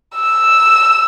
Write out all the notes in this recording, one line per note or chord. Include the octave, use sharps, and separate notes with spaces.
E6